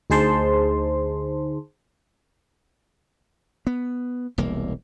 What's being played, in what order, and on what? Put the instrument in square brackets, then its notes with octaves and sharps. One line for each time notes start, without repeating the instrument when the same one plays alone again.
[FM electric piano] D2 D#4 G#4 C5 A5 C6
[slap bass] B3
E1 C2 A#3